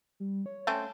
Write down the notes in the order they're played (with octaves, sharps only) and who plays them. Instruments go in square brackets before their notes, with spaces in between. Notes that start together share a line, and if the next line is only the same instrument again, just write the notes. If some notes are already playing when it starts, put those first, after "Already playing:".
[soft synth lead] G3
C#5
[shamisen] A3 C4 C#4